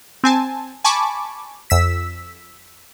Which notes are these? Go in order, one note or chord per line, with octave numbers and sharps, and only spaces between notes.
C4 G#5 A5
G#5 A5 B5 C#6 D6
F2 E6 B6